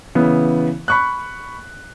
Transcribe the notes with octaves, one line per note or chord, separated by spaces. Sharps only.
C#3 E3 B3
B5 C#6 F#6